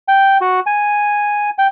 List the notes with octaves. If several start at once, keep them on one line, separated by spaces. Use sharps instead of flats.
G5
F#4
G#5
G5